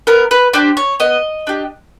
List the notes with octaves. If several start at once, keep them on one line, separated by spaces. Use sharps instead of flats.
B3 A#4
B4
D4 G4 C5
C#5
B3 D#5
D4 G4